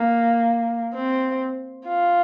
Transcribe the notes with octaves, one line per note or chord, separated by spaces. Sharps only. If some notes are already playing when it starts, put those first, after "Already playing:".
Already playing: A#3
C4
F4